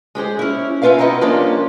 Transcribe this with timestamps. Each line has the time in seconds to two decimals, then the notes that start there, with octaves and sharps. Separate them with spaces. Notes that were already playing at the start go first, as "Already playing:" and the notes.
0.15 G#3 G4 G#4 C5
0.39 C#4 E4
0.82 C4 C#4 F4 B4 E5 F5
0.98 C4 D#4 E4 D#5 F#5
1.21 F3 G3 A#3 C#4 D4 F4